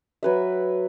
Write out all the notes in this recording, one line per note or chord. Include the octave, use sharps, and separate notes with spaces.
F#3 B4 E5